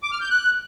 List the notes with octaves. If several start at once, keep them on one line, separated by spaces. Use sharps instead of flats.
D6
F6
G6
F#6